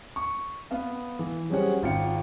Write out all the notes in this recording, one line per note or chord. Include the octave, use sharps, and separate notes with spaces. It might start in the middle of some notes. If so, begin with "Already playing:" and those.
C#6
B3 F5
E3
F#3 G3 C#4 G#4 C5 F#5
G#1 F4 G5 C#7